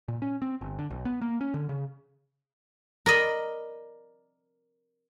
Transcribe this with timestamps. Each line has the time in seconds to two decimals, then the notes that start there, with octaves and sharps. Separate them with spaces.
0.08 A#2
0.22 C#4
0.42 C4
0.61 G1
0.79 D3
0.90 B1
1.05 B3
1.21 A#3
1.41 C#4
1.54 D3
1.69 C#3
3.06 A#4 D5 D#5 B5